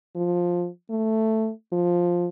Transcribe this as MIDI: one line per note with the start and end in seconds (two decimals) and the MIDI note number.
0.15 0.67 53
0.90 1.50 57
1.72 2.28 53